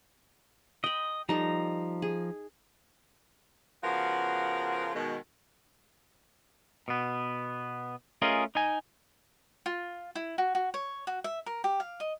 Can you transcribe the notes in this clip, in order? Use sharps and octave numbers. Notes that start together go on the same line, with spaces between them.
D#5 G5 B5
F3 G3 D#4 A4 A#5
G#4
C#3 F3 B3 F4 F#4 A#4
B2 D#3 G#3
B2 B3
A3 C#4 F4 G#4 A#4 D#5
D#4 G#5
F4
E4
F#4
F#4
C#5
F#4
E5
A#4
G4
F5
D#5